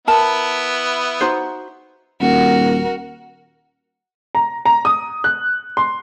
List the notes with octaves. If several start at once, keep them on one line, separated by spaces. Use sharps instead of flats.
B3 E4 A#4 A5
D#4 F#4 C5
D#1 F#4 A#4
A#5
A#5
D#6
F#6
C6